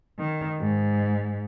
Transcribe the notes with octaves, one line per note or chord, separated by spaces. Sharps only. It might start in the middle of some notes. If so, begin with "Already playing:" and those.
D#3
G#2